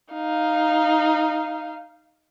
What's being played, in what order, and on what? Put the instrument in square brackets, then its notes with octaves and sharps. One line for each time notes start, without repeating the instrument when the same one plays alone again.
[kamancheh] D#4 F5